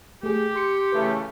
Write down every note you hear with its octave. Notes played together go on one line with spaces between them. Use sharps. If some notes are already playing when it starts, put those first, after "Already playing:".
A3 G4 G#4
C6 C#7
C#3 E3 A3 B4